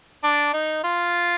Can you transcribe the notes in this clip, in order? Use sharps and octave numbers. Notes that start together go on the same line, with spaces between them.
D4
D#4
F4